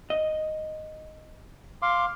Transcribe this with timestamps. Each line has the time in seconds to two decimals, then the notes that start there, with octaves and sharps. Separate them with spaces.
0.10 D#5
1.82 F5 C6 D6